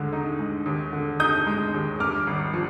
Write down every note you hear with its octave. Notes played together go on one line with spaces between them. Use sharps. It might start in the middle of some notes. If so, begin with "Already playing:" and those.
Already playing: D#2 D3 G#3
D#4
G#3
D#2
D3
D#4 D#6 G6
G#3
D#2
G2 D6 F6
G#1
F3